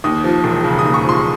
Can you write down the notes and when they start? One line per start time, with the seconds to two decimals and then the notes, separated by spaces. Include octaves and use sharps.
0.04 D#2 D#6
0.24 F3
0.44 E1
0.64 C#3
0.79 D#6
0.84 D#2
0.94 C#6
1.04 F3
1.09 C6